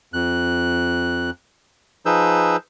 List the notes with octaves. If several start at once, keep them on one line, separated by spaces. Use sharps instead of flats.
F2 F#6
F3 D#4 G#4 B4 E6 G6